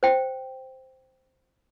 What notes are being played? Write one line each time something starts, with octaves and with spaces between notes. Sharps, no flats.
C5 G5